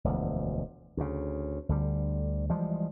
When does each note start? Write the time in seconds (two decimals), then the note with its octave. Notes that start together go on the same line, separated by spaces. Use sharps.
0.04 E1 D2 F3
0.97 D2 C#3
1.69 D2 D3 G3
2.49 E3 F3 G3 G#3